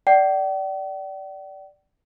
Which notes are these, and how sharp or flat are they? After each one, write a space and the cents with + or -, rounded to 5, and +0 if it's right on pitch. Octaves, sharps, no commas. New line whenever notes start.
D5 -5 G5 -45